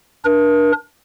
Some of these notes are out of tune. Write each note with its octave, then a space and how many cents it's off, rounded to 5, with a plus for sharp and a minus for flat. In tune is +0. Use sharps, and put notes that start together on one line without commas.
D4 +5 A#4 +40